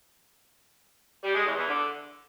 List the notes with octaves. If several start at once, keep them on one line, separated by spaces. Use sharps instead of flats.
G3
G#3
E2
E2
D3